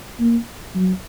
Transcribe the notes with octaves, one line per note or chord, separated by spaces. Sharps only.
A#3
F#3